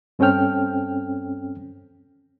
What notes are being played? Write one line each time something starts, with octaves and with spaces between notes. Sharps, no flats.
G2 C4 C#4 A4 G5 F6